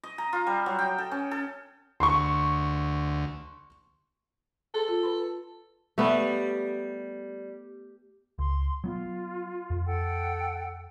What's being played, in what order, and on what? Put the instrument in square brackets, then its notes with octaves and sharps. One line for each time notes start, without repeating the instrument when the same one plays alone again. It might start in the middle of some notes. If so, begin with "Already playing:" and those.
[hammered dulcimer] D#5
A#5
F4
G3
F#3
G5
A4
C#4
A4
[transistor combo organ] D2 [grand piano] C6 C#6
[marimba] G#4 A5 C6 [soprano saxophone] A4
[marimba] F4
B4 B5 C6
[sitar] G3 [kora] A3 B3
[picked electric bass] C#2 [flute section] C6
[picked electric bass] F#3 B3 [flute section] F4
[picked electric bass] F2
[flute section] A4 F#5 G5